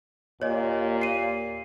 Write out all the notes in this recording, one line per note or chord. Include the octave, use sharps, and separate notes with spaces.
D#2 A#2 C#5 D#5
C7 D#7